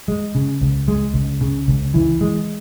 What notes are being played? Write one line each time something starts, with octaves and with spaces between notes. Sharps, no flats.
G#3
C#3
C#2
G#3
C#2
C#3
C#2
E3
G#3